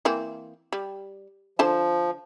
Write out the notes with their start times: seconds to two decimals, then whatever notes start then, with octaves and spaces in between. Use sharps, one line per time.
0.05 E3 A#3 C4
0.73 G3
1.59 D3 F3 C5 A5